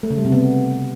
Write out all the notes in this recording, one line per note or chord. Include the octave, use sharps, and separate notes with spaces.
A3
C#3
G3
C3
B3